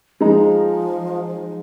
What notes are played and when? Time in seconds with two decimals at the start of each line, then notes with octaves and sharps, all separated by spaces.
0.21 F3 G#3 D#4 A#5